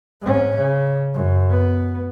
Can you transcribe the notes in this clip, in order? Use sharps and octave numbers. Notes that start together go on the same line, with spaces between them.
G#2 C#4
C#3
F#2
B3